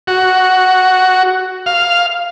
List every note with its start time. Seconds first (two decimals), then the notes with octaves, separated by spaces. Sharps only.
0.07 F#4
1.66 F5